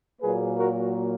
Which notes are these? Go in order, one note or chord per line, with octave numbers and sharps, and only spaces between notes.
A#2 F#3 A#3 G#4 B4
F#4 A#4